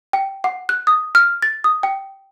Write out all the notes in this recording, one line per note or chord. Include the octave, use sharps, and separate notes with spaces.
G5
F#5
F#6
D#6
F6
A6
D#6
G5